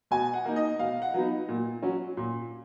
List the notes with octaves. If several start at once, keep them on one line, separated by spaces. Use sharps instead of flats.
B2 G#5
F#5
A#3 D#4
D#5
B2 F5
F#5
F#3 B3 D#4
A#2
F#3 C#4
A#2